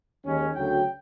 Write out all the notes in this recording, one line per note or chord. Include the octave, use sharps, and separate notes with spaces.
D#2 D#3 G#3 C#4
D2 C#3 F#3 G5